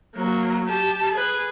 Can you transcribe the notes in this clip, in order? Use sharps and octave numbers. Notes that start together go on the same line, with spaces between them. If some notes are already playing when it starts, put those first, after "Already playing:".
F#3 A#3
G4 A5
G#4 B4